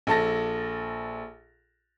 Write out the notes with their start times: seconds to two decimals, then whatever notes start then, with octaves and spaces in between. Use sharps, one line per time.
0.07 A#1 A4 A5 A#6